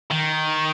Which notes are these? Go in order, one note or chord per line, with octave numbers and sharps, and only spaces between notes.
D#3